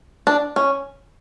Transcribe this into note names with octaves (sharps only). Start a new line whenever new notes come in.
D4
C#4